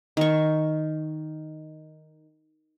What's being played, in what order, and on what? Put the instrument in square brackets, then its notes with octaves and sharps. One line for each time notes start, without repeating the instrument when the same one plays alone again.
[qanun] D#3 C#6